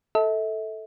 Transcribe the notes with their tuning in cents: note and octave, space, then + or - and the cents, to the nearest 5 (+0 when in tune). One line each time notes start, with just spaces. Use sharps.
A4 +0 E5 -40